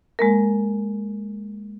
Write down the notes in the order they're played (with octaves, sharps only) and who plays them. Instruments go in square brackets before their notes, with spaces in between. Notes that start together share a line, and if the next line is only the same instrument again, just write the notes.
[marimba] G#3 A#3 A#4